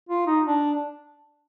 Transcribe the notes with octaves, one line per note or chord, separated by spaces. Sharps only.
F4
D#4
D4